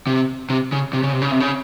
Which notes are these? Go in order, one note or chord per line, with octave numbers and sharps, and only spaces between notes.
C3
C3
C#3
C3
C#3
C3
C#3
C3
C#3